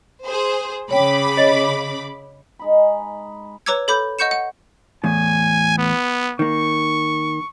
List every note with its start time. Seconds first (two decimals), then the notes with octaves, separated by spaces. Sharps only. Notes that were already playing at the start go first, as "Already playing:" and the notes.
0.25 G#4 C5
0.91 C#3 C#5 G5 B5 D6
1.37 C#5 D#5 A6
2.59 G#3 D#4 B5
3.66 B4 C#5 A#5 D6 E6 G#6
3.88 A4 C#5 B5 D6 G6
4.19 D#5 F#5 C#6 G6 C#7 E7
4.31 F#5
5.04 E2 A2 G#5
5.78 B3
6.39 D#3 A#3 C#6